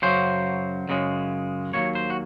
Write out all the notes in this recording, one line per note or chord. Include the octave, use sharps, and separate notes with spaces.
F#2 C#3 F#3 C5
F#2 C#3 G#3
D#2 D#3 F#3 A#3 C#5
C5
F#4